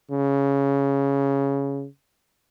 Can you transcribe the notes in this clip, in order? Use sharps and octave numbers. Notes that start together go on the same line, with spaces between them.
C#3